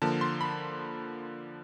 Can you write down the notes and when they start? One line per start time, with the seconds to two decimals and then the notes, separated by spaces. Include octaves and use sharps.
0.02 D3 F3 A#3 A5
0.21 C6
0.41 B5